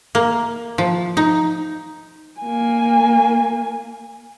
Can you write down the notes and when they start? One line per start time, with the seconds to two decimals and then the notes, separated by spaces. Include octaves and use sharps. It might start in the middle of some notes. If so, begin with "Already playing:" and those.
0.15 A#3
0.78 F3
1.17 D#4
2.40 A#3 G#5